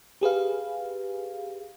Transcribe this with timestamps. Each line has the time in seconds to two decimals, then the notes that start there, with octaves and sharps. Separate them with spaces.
0.21 G4 G#4 B4 F5